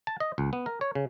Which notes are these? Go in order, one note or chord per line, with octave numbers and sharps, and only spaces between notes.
A5
D#5
C#2
B3
A#4
C#5
C#3